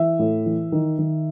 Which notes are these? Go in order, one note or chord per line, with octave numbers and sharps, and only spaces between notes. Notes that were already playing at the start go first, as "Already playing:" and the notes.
Already playing: E3 E5
A2
E3
D#3
D#3